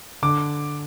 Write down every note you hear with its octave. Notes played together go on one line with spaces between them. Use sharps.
D3 D6